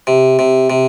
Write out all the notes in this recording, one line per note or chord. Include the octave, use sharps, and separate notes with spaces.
C3
C3
C3